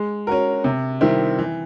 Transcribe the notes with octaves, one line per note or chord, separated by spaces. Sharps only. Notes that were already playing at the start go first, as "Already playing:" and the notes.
Already playing: G#3
C#4 F#4 A#4
C3
D#3 G3 C4 E4
E3